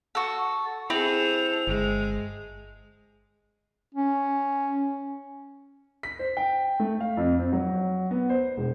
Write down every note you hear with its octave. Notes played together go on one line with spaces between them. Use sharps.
F#4 A4
C4 E4 G#4 A4 F7
G1 G#3
C#4
B6
C5
G5
A3
F5
F2
C4
F#3
B3
C5
E1